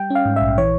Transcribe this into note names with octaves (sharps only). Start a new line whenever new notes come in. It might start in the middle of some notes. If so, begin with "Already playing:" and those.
Already playing: G3 G5
C#4
F5
G#2
A#1 E5
E3 C#5